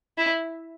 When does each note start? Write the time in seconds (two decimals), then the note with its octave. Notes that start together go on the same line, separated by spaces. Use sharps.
0.18 E4